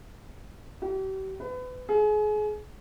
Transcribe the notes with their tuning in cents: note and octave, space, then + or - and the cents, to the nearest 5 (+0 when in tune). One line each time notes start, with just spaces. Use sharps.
G4 -40
B4 +30
G#4 +30